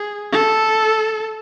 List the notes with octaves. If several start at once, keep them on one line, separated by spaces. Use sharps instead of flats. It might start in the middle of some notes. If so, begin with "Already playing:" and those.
Already playing: G#4
A4